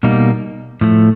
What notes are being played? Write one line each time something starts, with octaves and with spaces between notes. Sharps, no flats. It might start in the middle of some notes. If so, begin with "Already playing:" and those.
B2 G3 A#3 D#4
A2 F3 A3